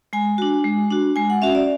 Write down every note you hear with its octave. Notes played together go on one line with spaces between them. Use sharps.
G#3 G#5
D4 F#4
G#3
D4 F#4
G#3 G#5
F#5
C#4 F#4 E5
D5